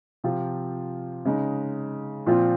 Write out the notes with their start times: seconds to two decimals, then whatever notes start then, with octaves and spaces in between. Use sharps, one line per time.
0.24 C3 F3 C4 F4
1.25 C#3 G#3 D#4
2.27 A#2 F3 C4 F4